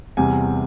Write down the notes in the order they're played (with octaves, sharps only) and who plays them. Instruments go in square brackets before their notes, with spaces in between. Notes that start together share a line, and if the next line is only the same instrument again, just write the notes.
[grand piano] E2 C3 G3 G#5